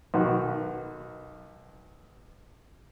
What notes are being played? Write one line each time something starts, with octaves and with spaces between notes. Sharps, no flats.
B1 D#3 F#4 B4